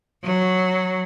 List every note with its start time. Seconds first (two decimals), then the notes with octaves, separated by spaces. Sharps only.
0.24 F#3